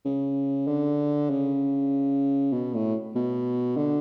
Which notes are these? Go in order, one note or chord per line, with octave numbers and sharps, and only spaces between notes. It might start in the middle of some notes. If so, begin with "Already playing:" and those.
C#3
D3
C#3
B2
A2
B2
D3